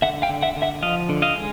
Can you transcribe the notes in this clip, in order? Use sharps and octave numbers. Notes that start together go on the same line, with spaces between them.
D3 E5 F#5
F5 G5
D3
E5 F#5
D3
E5 F#5
F3 D#5 F5
D3
D#5 F5
G#3